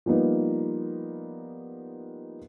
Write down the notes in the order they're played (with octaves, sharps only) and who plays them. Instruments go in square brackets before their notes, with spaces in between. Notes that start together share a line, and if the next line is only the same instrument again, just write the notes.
[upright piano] F3 G3 A#3 B3 D#4